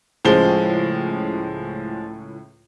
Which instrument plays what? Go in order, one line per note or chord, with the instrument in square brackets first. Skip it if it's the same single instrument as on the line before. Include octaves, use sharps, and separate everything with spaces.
[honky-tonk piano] C#2 A2 C#4 [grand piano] F3 G#3 G7